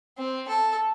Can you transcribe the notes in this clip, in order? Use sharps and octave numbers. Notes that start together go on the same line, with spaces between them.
C4
A4